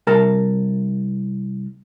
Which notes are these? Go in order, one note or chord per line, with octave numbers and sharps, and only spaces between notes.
C2 A#4 A5